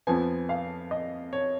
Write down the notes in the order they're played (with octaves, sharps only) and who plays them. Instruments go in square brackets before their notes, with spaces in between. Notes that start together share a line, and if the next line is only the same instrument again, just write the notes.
[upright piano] F2 F3 B3 G#5
F5
D#5
C#5